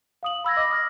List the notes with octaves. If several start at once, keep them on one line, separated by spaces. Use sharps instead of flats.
F5 D#6 F#7
B5 E6 G#6 A#6
D#5 D6 A#6
D#6 F6 A#6